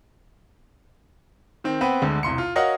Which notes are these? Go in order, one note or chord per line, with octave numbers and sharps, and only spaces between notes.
D#3 C4
B3 C4 B4
D2 D3 G#3
E1 C2 C6 C#7
F4
F#4 A#4 C#5 D#5 F5 F#5